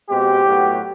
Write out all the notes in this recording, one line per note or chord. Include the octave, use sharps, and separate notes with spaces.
B2 G#3 C4 G4
A2 F#3 B3